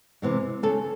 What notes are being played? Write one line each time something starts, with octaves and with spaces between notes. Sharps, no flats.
C3 E3 G#3
C#3 A4